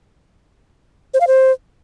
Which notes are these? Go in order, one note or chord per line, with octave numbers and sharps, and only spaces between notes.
C5
F5
C5